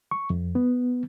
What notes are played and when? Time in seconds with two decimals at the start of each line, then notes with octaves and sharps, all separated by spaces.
0.11 C#6
0.30 F2
0.55 B3